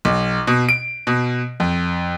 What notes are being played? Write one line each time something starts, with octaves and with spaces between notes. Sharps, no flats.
B1
B2
D7
B2
F2